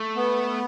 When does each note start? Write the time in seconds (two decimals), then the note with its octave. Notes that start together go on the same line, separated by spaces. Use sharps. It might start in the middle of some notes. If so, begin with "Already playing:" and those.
Already playing: A3
0.16 B3